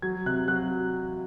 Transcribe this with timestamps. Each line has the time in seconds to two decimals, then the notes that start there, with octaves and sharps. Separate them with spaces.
0.02 F#3 G#6
0.26 C3 F#6
0.48 F#3 F#6